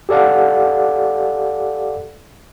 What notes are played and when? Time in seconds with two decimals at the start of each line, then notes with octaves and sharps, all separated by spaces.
0.09 G4 A4 D5 F5 F#5